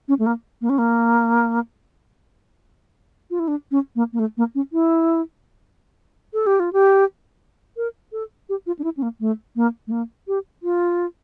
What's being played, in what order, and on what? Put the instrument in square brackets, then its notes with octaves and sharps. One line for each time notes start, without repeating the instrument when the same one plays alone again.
[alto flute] C#4
A3
A#3
A#3
C#4
A#3
F4
E4
D4
C#4
A#3
A#3
A3
A#3
C#4
E4
A4
G4
F4
G4
A#4
A4
G4
F4
D4
E4
C#4
A#3
A3
A#3
A3
A#3
G4
F4